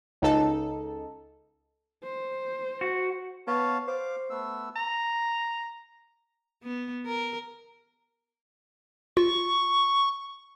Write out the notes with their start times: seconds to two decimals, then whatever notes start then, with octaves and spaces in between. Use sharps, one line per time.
0.22 C#2 D#4 A4
2.04 C5
2.81 F#4
3.47 B3 C#5 F5 A5
3.88 C5 F5 D6
4.30 A3 B3 E6
4.76 A#5
6.63 B3
7.06 A#4
9.17 F4 C#6